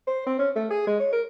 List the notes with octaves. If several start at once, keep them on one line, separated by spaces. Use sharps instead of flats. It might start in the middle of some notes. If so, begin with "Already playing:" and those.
C5
C4
C#4
A3
G#4
G#3
C#5
A#4